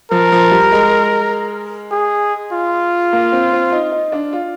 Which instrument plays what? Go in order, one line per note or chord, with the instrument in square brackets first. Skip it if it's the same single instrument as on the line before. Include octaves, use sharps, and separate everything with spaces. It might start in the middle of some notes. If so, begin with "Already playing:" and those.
[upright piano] F3 [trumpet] A#4
[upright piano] F3
G3
G#3
[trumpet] G#4
F4
[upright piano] A#3
C4
C4
D#4
D#4
D4
F4